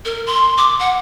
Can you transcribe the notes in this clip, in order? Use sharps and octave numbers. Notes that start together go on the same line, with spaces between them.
A#4
C6
D6
F#5